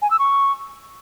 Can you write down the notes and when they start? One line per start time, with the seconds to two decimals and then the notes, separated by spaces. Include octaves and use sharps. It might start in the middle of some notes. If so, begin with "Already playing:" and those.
0.02 G#5
0.11 E6
0.19 C#6